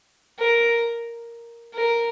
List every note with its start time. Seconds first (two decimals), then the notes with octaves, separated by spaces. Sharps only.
0.39 A#4
1.74 A#4